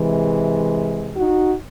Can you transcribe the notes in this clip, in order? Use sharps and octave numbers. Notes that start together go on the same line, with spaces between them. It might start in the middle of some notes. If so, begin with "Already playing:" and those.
Already playing: C3 E3 G#3
D#4 F#4